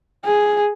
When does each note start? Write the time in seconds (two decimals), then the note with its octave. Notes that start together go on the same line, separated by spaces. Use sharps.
0.25 G#4